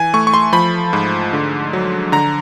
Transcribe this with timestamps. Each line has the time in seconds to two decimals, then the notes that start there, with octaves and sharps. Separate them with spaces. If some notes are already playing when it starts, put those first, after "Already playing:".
Already playing: E3 G#5
0.14 A3 C#6
0.27 C#6
0.34 C6
0.53 F3 B5
0.93 G#2
1.33 D3
1.73 F#3
2.12 D3 A#5